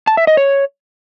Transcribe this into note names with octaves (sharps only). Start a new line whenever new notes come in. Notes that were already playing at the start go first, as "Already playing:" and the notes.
A5
E5
D#5
C#5